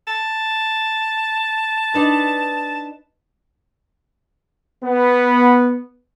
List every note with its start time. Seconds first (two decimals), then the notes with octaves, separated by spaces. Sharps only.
0.08 A5
1.94 D4 D#4 B4
4.83 B3